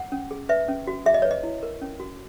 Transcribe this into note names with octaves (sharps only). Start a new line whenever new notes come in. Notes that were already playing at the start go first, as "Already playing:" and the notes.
Already playing: F#5
C#4
G#4
B4 E5
C#4
F#4
G#4 E5
D#5
B4 C#5
D#5
E4
A#4
C#4
F#4